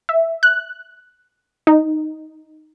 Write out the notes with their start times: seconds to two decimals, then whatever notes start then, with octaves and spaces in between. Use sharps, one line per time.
0.09 E5
0.43 F#6
1.67 D#4